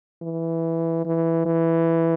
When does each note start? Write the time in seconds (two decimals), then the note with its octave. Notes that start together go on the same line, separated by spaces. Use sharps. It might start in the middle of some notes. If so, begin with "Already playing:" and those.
0.22 E3
1.05 E3
1.46 E3